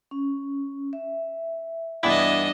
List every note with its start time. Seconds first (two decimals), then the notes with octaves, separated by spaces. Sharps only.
0.11 C#4
0.93 E5
2.03 G2 E3 B3 D4 E4 D#5